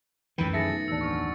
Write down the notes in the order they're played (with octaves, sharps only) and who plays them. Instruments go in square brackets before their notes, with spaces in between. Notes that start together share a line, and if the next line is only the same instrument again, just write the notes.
[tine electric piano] C#2 G5 B5 [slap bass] F#2 E3 [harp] D#3 A3
[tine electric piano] G#4 A4 E5 [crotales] A6 A#6 C#7
[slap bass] B2
[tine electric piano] A1 D#2 D4 [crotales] E6
[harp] F#2 F6 B6 [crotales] C#6